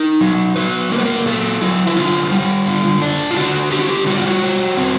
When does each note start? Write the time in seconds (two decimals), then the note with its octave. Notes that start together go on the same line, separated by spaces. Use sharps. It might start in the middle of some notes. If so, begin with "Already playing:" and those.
Already playing: D#4 A#4
0.21 F#3
0.56 F#3 B4
0.92 A#3 A#4
0.98 B4
1.06 A#4
1.26 F#3 A4
1.61 F#3 E4
1.87 E4
1.96 D3 F4
2.31 G3
2.66 D3
3.02 D4
3.31 F4
3.37 D3 F#4
3.72 D3 G4
3.81 F#4
3.89 G4
4.06 G3 F#4
4.17 F4
4.27 F#4
4.42 G3
4.77 C4